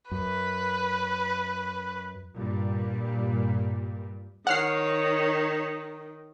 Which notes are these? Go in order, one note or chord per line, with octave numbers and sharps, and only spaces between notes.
F#2 B4
G2 A#2 G3
D#3 C#5 F#5 F6 C7